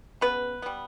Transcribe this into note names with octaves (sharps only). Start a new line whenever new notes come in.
C#3 B3 B4
G3 B3